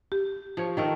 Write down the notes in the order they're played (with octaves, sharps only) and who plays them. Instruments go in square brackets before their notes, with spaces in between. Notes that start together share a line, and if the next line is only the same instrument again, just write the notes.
[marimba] G4
[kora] F3 C#5
D#3 A3 A#4